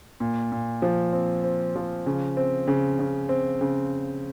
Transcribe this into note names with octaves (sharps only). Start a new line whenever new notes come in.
A#2
A#2
F3
C4
C4
F3
C#3
C4
C#3
C#3
C4
C#3